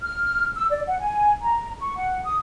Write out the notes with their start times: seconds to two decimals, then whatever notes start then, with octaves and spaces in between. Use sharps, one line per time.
0.01 F6
0.56 E6
0.70 D5
0.87 F#5
1.00 G#5
1.42 A#5
1.80 C#6
1.96 F#5
2.24 D#6